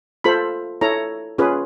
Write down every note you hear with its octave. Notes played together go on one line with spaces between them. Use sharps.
F4 A4 C5 B5
E4 A4 C#5 A#5
C#4 F4 G#4 B4